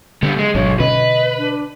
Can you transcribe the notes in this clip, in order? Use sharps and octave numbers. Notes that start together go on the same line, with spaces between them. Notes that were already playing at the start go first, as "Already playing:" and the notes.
D3 G3 B3
G#3
G#1 G#2 B2 F#3 D4 C#5
B2 D3 C#4 B4 D#5
D4